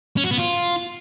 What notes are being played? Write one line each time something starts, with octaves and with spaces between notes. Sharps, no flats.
C#4
F#4
B3
F4